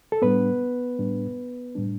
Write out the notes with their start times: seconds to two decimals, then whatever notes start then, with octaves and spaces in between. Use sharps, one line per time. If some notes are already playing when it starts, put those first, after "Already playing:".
0.12 A4
0.22 A2 G3 B3 D4 B4
0.99 A2 G3 D4
1.75 A2 G3 D4